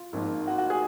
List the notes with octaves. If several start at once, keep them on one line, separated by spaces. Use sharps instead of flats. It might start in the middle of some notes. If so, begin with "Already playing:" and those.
Already playing: F4
G#1 G#2 F3 A#3
F#4
F#4
G#4